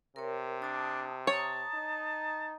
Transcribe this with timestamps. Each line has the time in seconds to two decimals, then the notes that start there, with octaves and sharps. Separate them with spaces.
0.16 C3 A#4 C#5
0.62 D4 A5 D#6
1.27 C#5 A5 A#5 D#6
1.74 D#4